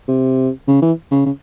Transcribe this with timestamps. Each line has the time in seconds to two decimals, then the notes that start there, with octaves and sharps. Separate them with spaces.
0.08 C3
0.68 C#3
0.82 E3
1.11 C#3
1.26 C#3